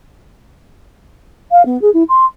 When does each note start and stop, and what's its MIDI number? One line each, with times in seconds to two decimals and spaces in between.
1.52 1.65 77
1.66 1.80 59
1.82 1.90 68
1.94 2.03 64
2.09 2.25 84